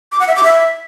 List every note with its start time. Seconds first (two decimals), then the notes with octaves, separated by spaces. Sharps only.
0.12 D6
0.20 F#5
0.28 E5
0.36 D6
0.43 E5